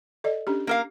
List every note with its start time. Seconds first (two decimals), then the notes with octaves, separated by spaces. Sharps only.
0.24 A4 D5 D#5
0.47 C#4 D4 G4
0.67 A#3 A#4 F5